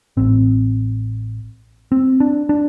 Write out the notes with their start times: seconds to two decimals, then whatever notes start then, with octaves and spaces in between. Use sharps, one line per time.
0.17 A1 A2 C4
1.92 C4
2.20 D4
2.49 D4